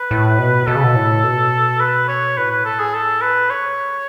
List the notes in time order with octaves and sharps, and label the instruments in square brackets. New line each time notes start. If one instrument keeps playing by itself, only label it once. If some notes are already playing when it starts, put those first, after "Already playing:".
Already playing: [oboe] B4
[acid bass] A2
B2
[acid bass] B2 [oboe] A4
[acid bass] C#3
B2
A2
B2
[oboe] B4
C#5
[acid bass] A2 [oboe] B4
[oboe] B4
A4
G#4
A4
B4
[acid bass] G#2 [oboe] C#5